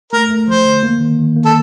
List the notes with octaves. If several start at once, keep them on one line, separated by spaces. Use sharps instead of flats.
A3 A#4
A3
F3 C5
D3
A#3
D#3
D#3
A#3
A4